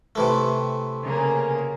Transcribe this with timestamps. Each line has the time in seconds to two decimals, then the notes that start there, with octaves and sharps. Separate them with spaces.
0.15 C3 E3 A3
1.03 C#3 A#3